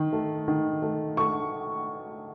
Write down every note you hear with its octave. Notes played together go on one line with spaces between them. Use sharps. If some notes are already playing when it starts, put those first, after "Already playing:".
Already playing: D#3
A3
D#3
A3
A3 C#6